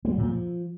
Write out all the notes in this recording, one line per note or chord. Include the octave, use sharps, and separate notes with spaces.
A#3
F#3
A#2
F3